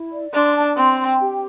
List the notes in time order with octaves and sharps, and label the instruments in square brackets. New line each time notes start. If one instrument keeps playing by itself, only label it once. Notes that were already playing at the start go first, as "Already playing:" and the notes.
Already playing: [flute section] E4
D5
[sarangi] D4 [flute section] C6
[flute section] A5
[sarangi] C4 [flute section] C6
[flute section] G5
G4